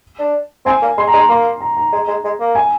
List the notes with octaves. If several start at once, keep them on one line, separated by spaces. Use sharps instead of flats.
D4
C4 G#5
A#3
G#3 C6
A#5
G#3
C6
A#3 C6
A#5
A#5
G#3
G#3
G#3
A#3
G#5